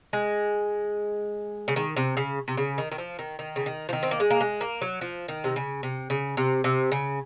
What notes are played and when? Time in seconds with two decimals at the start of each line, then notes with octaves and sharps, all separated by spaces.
0.13 G#3
1.68 C#3
1.76 D#3
1.96 C3
2.17 C#3
2.48 C3
2.57 C#3
2.78 D#3
2.92 D#3
2.98 F3
3.19 D#3
3.39 D#3
3.56 C#3
3.66 D#3
3.89 F3
3.93 D#3
4.03 C4
4.11 A#3
4.20 G#3
4.30 A#3
4.41 G#3
4.61 A#3
4.82 F#3
5.01 F3
5.28 D#3
5.44 C3
5.56 C#3
5.83 C3
6.10 C#3
6.37 C3
6.64 C3
6.92 C#3